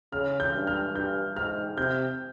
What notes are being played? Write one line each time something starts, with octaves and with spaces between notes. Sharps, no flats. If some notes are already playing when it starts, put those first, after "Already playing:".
C#3 F6
G6
G2
F6
G2 G6
G#2 F6
C3 G6